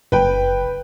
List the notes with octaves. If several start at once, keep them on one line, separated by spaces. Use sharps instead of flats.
F#1 B4 G5